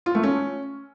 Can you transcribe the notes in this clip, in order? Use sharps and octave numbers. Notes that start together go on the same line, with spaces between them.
F4
A3
C#4